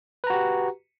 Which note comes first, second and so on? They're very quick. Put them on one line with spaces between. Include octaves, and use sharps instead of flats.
B4 A#5 F#4 G4